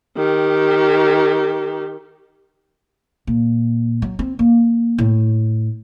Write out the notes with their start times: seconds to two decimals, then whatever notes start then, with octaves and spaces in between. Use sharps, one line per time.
0.17 D#3 G4
3.27 A#2
4.02 F#3
4.19 C4
4.39 A#3
4.98 A2